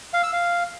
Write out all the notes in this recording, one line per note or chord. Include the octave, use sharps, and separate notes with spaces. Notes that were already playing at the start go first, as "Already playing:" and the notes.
F5
E6
F5